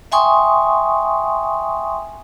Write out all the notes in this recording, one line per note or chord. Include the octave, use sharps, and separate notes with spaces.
E5 G5 G#5 C6 C#6 D#6